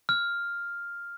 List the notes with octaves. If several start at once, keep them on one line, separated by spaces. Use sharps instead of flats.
F6